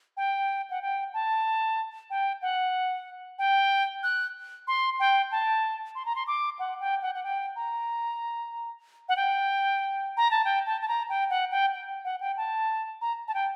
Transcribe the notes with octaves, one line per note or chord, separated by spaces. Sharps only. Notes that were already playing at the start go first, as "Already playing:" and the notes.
G5
F#5
G5
A5
G5
F#5
G5
F#6
C6
G5
A5
C6
A#5
C6
D6
F#5
G5
F#5
F#5
G5
A#5
F#5
G5
A#5
A5
G5
A5
A5
A#5
G5
F#5
G5
G5
F#5
G5
A5
A#5
A5
G5